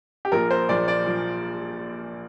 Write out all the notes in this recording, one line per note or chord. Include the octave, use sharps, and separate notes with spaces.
G4
A#1 A#2 F3 A#4
C5
A#1 A#2 F3 D5
D5
A#2 F3